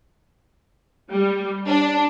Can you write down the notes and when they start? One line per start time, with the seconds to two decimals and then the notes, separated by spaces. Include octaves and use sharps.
1.11 G3
1.69 D4